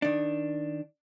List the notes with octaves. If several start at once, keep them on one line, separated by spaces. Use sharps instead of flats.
D#3 D4